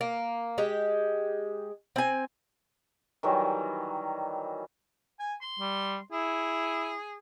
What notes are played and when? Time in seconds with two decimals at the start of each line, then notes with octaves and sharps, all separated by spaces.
0.01 A#3
0.58 G#3 G4
1.96 C4 G#5
3.23 D#3 E3 F#3 G3
5.20 G#5
5.42 C6
5.59 G3
6.12 E4 G#4